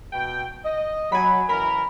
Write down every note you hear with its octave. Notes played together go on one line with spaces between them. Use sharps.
B2 G5
D#5
F#3 G#5 B5
F#2 E3 A#4 B5